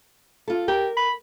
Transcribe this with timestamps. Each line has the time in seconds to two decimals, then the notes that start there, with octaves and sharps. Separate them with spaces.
0.48 F4 A4
0.68 G4 A#4
0.97 B5